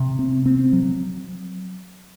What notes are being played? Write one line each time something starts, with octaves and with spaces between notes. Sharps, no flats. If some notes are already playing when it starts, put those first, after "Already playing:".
Already playing: C3
C4
C4
F#3